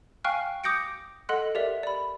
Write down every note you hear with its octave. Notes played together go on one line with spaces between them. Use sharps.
F5 G5 G#5 C#6 F6 F#6
D6 D#6 G6 A#6 C#7 D7
A4 D#5 F#5 C6 F#6
G4 A#4 D5 E5
D5 B5